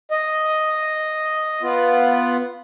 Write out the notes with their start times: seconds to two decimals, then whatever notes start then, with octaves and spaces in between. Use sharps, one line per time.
0.11 D#5
1.62 B3 F4